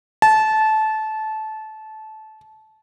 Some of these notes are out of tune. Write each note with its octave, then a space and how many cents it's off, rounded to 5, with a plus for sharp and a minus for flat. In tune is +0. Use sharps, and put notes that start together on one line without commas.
A5 -20